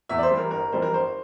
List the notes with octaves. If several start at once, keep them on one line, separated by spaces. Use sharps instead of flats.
E2 E5
D5
C5
E3 G3
A#4
G1 A#4
F2 E3 G3 C5
A#4
G1 C5